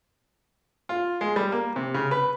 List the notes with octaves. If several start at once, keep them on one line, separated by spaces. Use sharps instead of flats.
F4
G#3
G3
A#3
C3
C#3
B4